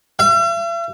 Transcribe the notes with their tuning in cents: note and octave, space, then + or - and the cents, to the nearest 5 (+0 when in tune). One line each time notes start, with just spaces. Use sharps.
E5 +45